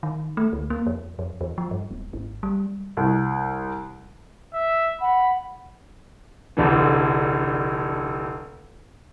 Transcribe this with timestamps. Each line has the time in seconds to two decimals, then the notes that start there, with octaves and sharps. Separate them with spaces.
0.03 D#3
0.37 A3
0.53 D2
0.70 A#3
0.86 F2
1.19 F2
1.41 E2
1.58 F3
1.71 G2
1.91 D#1
2.13 G#1
2.43 G3
2.97 C2
4.53 E5
5.01 F#5 B5
6.57 F1 A#1 D3 E3